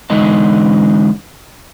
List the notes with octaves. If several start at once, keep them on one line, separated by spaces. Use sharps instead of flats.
D3 E3 G#3 D#4 D#5 A5